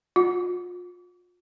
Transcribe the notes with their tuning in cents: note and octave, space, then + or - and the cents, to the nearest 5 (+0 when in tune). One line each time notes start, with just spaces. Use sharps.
F4 +35